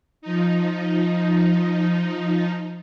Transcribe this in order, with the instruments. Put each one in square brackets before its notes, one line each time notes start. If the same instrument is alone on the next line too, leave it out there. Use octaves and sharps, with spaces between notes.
[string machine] F3 D#4